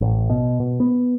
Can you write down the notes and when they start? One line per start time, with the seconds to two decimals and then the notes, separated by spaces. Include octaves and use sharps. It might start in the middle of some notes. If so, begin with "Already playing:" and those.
0.01 A1
0.30 B2
0.60 B2
0.80 B3